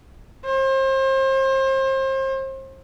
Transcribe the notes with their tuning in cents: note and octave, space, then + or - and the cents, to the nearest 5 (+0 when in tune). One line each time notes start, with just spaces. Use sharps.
C5 +35